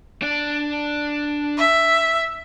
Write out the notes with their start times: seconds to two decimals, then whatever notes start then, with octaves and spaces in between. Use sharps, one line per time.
0.22 D4 D5
1.57 E5